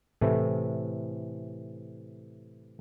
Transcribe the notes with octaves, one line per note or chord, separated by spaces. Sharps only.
A2 C3 E3 A3